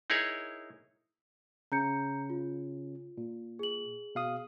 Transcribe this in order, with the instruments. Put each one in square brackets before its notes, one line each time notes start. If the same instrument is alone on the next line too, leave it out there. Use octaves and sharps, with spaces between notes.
[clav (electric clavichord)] D#4 E4 G#4 A#4 C#5
[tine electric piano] C#3 C#4 [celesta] A#5 G6 C#7
[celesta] F4
[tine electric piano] A#2
[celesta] G#4 F#7
[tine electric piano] B2 F5 D#6